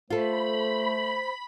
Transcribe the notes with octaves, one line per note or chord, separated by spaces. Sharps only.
A3 F4 A4 C5 B5